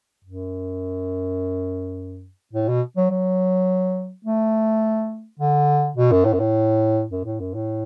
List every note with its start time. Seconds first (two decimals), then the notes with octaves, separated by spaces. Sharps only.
0.24 F#2
2.53 A2
2.68 B2
2.96 F#3
3.10 F#3
4.24 A3
5.39 D3
5.97 B2
6.11 F#2
6.25 A2
6.33 F#2
6.40 A2
7.11 F#2
7.24 A2
7.40 F#2
7.54 A2